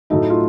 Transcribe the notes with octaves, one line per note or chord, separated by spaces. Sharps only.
A2 F#3 A3 D#4
F4